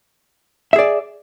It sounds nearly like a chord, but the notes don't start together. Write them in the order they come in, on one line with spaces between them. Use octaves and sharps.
E5 G#4 D5